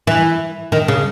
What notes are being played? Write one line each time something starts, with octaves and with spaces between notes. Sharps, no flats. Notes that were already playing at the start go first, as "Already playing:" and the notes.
E3
D#3
C#3